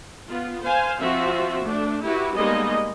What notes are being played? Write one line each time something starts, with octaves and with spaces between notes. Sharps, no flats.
B3 F4
C5 F5 G#5
F3 C4 F4 F#4 E5
A3 D4
E4 F#4 G4 B4
G3 G#3 A#3 B3 D#4 D#5